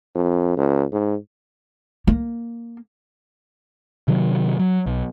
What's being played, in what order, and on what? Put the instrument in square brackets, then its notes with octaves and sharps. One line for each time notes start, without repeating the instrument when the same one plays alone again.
[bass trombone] F2
C#2
G#2
[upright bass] A#3
[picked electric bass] C3 D#3 F#3
F#3
B1